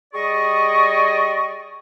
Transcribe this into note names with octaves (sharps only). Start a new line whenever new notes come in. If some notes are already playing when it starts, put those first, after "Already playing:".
G3 G#4 D5 D#5 C#6